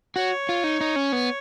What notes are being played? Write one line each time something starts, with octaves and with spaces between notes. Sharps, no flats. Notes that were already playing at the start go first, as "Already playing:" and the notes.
F#4 C#5
F4
D#4
D#4
C#4
B3